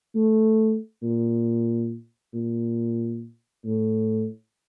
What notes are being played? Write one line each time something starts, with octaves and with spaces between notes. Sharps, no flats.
A3
A#2
A#2
A2